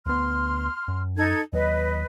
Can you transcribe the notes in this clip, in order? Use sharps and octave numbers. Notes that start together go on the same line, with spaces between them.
D2 B3 C6 F6
F#2
D#4 A4 G#6
D#2 F#3 B4 D#5